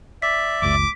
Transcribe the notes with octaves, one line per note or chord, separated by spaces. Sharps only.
D5 E5 B6
F#1 C#2 D6